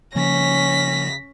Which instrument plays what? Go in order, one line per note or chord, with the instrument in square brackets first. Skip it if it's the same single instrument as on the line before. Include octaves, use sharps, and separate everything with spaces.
[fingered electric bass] C#3 F3 A#3 [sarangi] C#4 [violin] A#6 B6